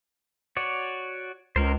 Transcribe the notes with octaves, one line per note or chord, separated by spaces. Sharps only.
F#4 C#5 D5
C#2 C#4 A#4 C5